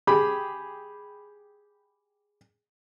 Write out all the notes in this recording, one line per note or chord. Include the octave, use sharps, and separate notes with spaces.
G4 G#4 B5